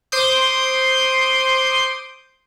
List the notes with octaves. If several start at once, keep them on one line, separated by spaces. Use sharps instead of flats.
C5 C6 D6 D#6 G6